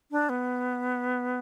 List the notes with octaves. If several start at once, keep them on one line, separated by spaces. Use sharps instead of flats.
D4
B3